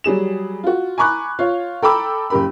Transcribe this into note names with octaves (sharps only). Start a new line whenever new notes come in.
F#3 G3 G#4 E7
F4 F#4
G#5 A#5 B5 C#6 D6 F#6
F4 C#5 F5
A4 G5 A#5 B5 D6 E6
F#1 C#3 G4 A#4 B5